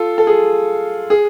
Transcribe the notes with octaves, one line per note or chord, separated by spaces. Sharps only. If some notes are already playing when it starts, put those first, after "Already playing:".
Already playing: F4 A4
A4
G#4
G#4